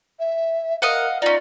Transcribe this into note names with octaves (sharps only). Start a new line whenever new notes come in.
E5
A#4 D#5 F5 F#5
C#4 D#4 F4 D5